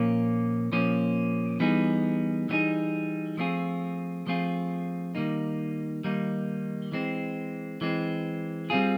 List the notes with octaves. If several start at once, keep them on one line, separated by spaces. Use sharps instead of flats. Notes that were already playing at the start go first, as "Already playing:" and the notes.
Already playing: A#2 F3 A#3 C#4
A#2 F3 A#3 C#4
E3 G3 B3 D#4 G#4
E3 G3 B3 D#4 G#4
F3 A3 C4 F4 G#4
F3 A3 C4 F4 G#4
D#3 G3 A#3 D#4
D#3 G3 A#3 D#4
E3 G#3 C4
E3 G#3 C4
G3 C4 F4 G#4